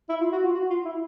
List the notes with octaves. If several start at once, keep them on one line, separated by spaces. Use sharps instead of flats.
E4
F4
F#4
F4
F#4
F4
E4